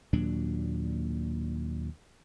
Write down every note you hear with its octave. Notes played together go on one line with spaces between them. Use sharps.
D#2 A#2 F#3 D4